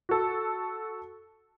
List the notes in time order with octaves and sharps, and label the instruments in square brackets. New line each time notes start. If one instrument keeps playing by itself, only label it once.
[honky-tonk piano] F#4 A4